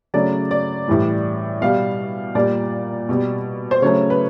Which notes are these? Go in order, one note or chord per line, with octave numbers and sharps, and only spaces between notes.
C#3 F#3 A3 D5
D5
A2 E3 G3
B2 G3 F5
A#2 G3 D5
B2 G3
C5
C#3 F#3 A3 C#5
B4